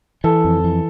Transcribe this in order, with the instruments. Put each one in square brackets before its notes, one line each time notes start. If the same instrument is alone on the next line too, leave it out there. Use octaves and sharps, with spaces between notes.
[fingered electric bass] E3 [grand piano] A4
[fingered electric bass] F2
E3